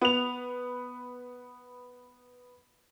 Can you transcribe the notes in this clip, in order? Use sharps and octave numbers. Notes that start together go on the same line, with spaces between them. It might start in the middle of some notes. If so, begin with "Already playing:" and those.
B3 F7